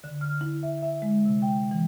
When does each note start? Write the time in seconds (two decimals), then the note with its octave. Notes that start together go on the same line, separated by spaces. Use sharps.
0.04 D3
0.21 F6
0.41 E4
0.63 E5
0.82 E5
1.02 G#3
1.26 C3
1.42 G5
1.71 E3